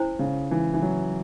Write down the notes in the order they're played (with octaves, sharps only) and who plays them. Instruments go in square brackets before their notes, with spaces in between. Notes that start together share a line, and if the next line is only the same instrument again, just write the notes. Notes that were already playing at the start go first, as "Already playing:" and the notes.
Already playing: [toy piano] C#4 E4 C5
[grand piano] C#3
E3
E3
F#3